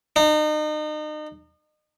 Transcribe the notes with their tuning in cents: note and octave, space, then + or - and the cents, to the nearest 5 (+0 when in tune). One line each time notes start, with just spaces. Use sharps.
D#4 -35